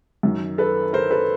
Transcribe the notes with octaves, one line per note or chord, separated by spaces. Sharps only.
F#2 D#3
A4 B4
A#4 C5
A4 B4